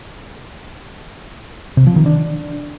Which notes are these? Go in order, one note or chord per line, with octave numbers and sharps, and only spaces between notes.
C3
F3
D#3
D4